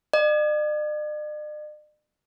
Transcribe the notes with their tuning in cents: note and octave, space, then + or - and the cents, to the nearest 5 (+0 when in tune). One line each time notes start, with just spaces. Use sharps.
D5 +45